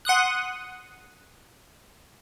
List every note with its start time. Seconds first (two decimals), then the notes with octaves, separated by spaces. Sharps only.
0.05 F#5 C6 D#6 F#6